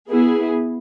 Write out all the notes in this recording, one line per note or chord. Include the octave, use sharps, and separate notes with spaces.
B3 E4 G#4